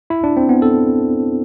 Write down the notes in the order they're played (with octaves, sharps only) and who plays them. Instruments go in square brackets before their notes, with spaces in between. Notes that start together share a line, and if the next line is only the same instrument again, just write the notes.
[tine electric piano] E4
D4
C4
B3
A4